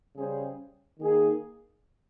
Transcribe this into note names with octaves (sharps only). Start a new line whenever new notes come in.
C#3 G3 C#4 G#4 C5
D#3 A#3 D#4 G#4